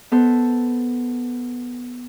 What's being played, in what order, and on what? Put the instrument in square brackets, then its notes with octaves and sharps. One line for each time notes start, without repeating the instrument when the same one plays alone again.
[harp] B3 A4 C5